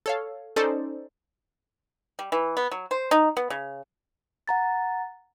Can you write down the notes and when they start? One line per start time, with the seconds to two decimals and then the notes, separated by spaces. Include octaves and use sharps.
0.06 A4 C#5 F5
0.56 C#4 D#4 A4 C5 D5
2.19 G3
2.32 E3
2.57 B3
2.71 F#3
2.91 C5
3.11 D#4
3.37 B3
3.50 C#3
4.48 F#5 A#5 A6